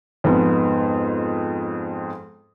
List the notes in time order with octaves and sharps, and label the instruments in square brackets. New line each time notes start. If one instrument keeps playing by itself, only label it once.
[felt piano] F2 G#2 G#3 B3